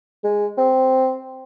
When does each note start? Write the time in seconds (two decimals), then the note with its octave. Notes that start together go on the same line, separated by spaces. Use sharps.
0.24 G#3
0.57 C4